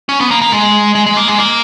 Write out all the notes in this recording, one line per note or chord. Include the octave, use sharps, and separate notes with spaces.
C#4
B3
A#3
A#3
G#3
G#3
G#3
A#3
G#3
A#3